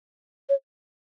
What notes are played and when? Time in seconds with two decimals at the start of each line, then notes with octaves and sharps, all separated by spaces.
0.49 C#5